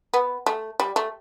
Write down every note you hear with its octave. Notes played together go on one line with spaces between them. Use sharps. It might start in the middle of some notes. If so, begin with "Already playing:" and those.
B3
A3
G3
A3